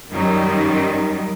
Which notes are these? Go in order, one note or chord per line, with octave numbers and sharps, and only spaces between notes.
F#2 D#3 F#3 G3